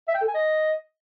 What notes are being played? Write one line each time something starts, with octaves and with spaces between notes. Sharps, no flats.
E5
G5
A4
G#5
D#5